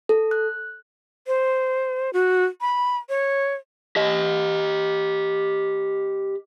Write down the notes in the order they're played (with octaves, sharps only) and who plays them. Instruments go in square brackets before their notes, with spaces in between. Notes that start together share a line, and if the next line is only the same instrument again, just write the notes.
[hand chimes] A4
F#6
[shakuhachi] C5
F#4
B5
C#5
[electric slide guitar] G4 D#5